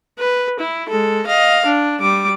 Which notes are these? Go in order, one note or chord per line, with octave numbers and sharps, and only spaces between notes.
B4
E4
G#3 A4
D#5 F5
D4
G3 D6